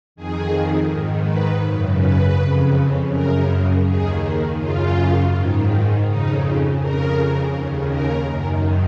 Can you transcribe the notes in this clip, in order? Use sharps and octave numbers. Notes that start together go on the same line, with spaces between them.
F2 D#3 G#4
G#2 D#3
B4
F#2 C#3
B4
F2 C#3
F#2 C#3 A#4
D#2 D#3 G#4
F#2 C#3 F4
G#2 D#3
F2 C#3 D#4
F2 C#3 A#4
D#2 C#3
A#4
F#2 D#3